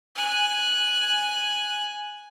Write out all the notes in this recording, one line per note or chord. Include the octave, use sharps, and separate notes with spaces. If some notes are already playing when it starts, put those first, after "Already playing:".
G#5 F#6